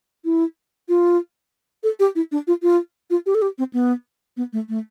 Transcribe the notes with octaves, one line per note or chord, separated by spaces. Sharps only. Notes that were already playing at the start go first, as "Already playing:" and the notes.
E4
F4
A4
G4
E4
D4
F4
F4
F4
G4
A4
G4
C4
B3
B3
A3
A3